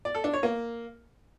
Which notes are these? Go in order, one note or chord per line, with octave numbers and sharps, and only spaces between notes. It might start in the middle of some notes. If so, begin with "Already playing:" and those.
D5
A4
D4
C#5
A#3